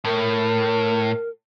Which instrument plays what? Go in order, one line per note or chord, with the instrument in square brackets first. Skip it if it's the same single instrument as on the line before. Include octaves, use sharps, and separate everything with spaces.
[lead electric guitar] A2 [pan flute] A#4